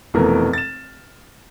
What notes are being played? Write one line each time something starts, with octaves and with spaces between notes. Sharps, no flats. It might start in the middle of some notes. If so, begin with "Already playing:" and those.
F1 B2 E3 A3 A#4
A6 E7